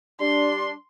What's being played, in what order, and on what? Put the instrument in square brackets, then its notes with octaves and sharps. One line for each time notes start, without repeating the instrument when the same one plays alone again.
[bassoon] G3 [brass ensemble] D4 [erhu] C6